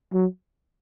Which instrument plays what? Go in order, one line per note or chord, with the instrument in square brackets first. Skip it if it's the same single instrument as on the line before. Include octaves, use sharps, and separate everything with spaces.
[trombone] F#3